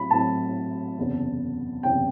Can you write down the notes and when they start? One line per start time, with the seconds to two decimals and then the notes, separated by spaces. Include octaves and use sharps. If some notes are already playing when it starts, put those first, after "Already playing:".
Already playing: A2 F#3 C4 B5
0.10 A2 F#3 C4 A5
0.97 F#1 E2 C3
1.83 F#1 E2 C3 G5